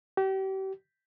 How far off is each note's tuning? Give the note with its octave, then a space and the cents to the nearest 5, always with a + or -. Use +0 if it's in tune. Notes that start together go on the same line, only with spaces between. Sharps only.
G4 -35